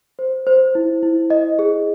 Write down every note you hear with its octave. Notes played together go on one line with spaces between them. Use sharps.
C5
C5
E4
E4
D#5
G#4